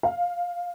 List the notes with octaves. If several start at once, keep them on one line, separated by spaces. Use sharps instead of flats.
F5